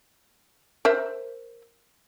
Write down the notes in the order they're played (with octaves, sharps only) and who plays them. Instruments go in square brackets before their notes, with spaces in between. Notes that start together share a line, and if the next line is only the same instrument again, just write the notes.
[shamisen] A#4 C5 E5